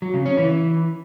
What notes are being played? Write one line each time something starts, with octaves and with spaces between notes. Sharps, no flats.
F#3
C#3
C#4
E3